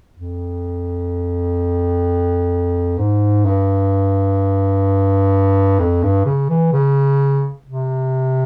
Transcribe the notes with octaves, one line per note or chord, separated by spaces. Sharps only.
F2
G#2
G2
F2
G2
C#3
E3
C#3
C3